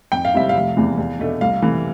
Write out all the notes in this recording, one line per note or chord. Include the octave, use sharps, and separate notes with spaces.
F2 G5
F5
C3 G3 C4 E4 E5
F5
F1
E2 C3 E3
E2
B2 A3 D4
C2 F5
C3 E3 A3